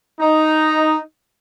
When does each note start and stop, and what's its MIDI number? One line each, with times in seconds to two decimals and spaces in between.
0.20 0.98 63